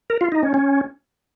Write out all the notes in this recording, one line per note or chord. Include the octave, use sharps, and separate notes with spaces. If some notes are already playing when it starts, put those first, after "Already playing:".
A#4
F4
D#4
C#4
C#4